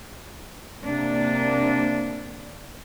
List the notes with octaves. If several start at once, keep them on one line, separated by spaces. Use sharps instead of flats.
C3 A#3 D4